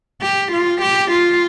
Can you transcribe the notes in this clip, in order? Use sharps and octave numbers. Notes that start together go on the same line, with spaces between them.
G4
F4
G4
F4